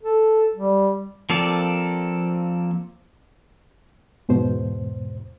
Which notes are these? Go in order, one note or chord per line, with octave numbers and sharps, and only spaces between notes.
A4
G3
F3 A#3 C4 A4 D5
E2 G#2 B2 C5